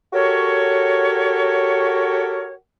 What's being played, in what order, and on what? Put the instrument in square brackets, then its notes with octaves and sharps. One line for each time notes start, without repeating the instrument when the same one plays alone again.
[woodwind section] F#4 G4 A4 A#4 C#5